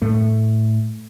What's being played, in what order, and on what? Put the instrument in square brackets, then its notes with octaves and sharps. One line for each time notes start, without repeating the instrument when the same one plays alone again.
[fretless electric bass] A2 A3